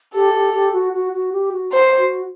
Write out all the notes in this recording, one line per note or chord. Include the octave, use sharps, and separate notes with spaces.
G4 A4
G4
G4
F#4
F#4
F#4
G4
F#4
C5
F#4